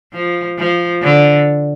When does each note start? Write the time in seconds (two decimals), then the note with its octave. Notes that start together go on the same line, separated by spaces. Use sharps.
0.13 F3
0.58 F3
1.02 D3